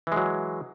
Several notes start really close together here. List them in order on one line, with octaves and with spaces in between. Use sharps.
E3 G#3 F#3